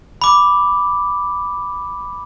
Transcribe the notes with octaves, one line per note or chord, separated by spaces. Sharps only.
B5 D6